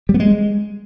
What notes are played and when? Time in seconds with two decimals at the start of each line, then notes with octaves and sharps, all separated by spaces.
0.09 G3
0.14 B3
0.20 G#3